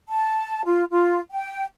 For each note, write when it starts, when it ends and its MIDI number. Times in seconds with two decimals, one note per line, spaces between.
0.09 0.62 81
0.65 0.84 65
0.91 1.19 65
1.31 1.64 79